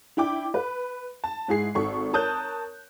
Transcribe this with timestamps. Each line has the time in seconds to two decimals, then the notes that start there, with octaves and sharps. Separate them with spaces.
0.17 D4 E4 G5 D6
0.54 B4
1.24 A5
1.48 G#2 E4 G#4 C7
1.75 G#1 A4 C#6
2.13 A#4 C#5 A5 D#6 F#6 G6